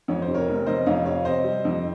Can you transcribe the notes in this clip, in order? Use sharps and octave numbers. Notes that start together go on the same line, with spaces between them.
F2 C#5
C5
C3
A#4 C#5
F1
F1 C5 D#5
F2 C#5 F5
C3 C#5 F5
C3 C5 D#5
G3
F2